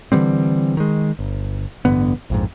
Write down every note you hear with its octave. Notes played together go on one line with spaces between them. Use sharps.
D3 E3 G3 C4
D#3 G#3
G1
A1 G2 D3 B3
A#1 F2 G#2